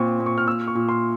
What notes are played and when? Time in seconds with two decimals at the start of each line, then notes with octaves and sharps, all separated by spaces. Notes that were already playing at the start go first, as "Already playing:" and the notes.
Already playing: A#2 C4 C#6
0.20 A#2
0.26 C#6
0.38 F6
0.47 A#2 E6
0.67 C#6
0.75 A#2
0.89 C6